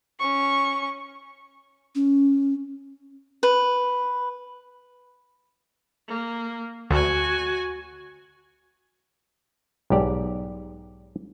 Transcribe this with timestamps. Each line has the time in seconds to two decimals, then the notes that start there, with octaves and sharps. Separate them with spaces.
0.20 C#4 C#6
1.95 C#4
3.43 B4
6.08 A#3
6.91 D2 F#4 G#5
9.90 B1 G#2 G4 D5